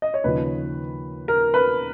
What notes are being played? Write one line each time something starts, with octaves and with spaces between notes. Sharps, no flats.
D#5
C#5
D#2 C#3 F3 B4
A#4
B4